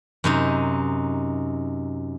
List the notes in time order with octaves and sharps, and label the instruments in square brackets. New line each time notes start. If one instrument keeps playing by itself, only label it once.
[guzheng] F#2 C3 D#4